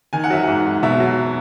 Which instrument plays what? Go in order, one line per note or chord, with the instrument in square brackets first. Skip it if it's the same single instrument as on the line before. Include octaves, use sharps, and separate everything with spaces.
[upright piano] D#3 G#5
F#5
F#3 E5
G#2 F#5
G#2
B2 E5
F#3